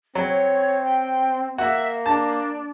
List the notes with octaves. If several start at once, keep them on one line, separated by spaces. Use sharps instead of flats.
F#3 C4 C#5
G5
A#3 F#4 E5
D4 A5